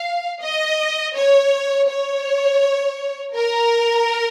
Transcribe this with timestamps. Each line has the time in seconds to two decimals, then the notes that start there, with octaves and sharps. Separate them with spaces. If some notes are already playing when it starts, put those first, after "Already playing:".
Already playing: F5
0.42 D#5
1.16 C#5
1.88 C#5
3.34 A#4